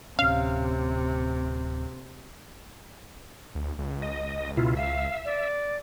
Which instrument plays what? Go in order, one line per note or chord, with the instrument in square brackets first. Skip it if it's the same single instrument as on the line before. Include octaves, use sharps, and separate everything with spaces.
[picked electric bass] D1 C#4 [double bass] C3 [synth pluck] F5
[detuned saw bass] D2
C#2
[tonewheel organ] D#5
B2 E4 F4
[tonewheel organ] E5 [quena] F5
[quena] D5